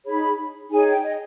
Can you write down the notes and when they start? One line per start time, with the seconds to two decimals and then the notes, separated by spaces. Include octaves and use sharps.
0.05 D#4 G#4 C#5 B5
0.71 D#4 G#4 C#5 G#5
0.87 G5
1.03 D#5